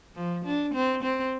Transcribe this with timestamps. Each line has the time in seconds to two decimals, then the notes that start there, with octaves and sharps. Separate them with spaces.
0.16 F3
0.45 D4
0.74 C4
1.03 C4